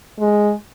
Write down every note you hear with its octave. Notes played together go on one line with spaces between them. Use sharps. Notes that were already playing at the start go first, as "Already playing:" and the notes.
G#3